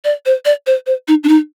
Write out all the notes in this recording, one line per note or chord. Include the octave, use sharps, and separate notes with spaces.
D5
C5
D5
C5
C5
D#4
D4
D#4